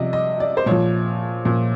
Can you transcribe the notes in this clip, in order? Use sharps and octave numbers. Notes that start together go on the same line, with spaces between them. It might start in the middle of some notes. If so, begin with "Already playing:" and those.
Already playing: C3 F3 D5 D#5
D#5
D5
C5
A#2 F3 C#5
A#2 F3